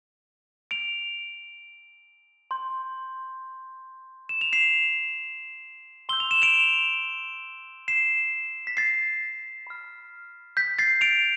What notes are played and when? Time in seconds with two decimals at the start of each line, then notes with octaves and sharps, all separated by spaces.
0.71 D7 F7
2.51 C6 G6
4.29 E7
4.41 F7
4.53 C7 E7
6.09 C6 E6 G6 G7
6.20 F7
6.31 E7
6.42 D7 F7
7.88 C7 E7
8.67 B6
8.77 A6 C7
9.67 B5 F6
10.57 G6 B6
10.79 A6 C7
11.01 D7 F7